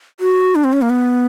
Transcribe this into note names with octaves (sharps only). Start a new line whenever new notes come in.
F#4
D4
C4
C#4
A#3
B3